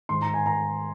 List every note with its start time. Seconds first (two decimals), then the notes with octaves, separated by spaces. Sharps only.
0.09 G#2 D#3 C6
0.22 A#5
0.34 G#5
0.46 A#5